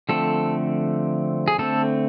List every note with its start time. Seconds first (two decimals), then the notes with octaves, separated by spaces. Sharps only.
0.09 D3 F3 A3 C4 A4
1.48 G#4
1.58 D3 A3 C4 A4